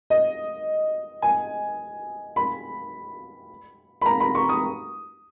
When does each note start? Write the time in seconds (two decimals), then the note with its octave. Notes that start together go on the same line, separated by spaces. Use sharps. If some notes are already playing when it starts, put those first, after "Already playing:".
0.10 D#5
1.22 G#5
2.36 B5
4.02 B5
4.06 A#5
4.20 B5
4.35 C#6
4.49 D#6